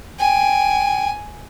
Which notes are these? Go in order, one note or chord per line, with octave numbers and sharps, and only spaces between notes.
G5 G#5